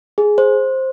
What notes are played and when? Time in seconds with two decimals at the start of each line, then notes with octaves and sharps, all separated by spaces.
0.18 G#4
0.38 C5